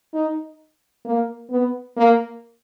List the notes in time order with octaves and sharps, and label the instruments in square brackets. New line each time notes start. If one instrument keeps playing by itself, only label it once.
[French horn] D#4
A#3
B3
A#3